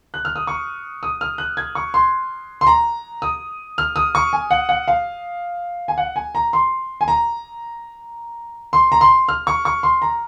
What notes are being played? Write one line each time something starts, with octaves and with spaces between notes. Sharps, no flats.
F#6
F6
D#6
C#6
D#6
F6
F#6
G#6
C#6
C6
C6
A#5
D#6
F6
D#6
C#6
G#5
F#5
F#5
F5
G#5
F#5
G#5
A#5
C6
G#5
A#5
C6
A#5
C6
F6
C#6
C#6
C6
A#5